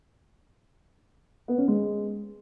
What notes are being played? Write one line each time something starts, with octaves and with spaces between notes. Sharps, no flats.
B3
C#4
G#3